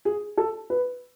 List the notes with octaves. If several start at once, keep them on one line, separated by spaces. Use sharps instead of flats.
G#4
A4
B4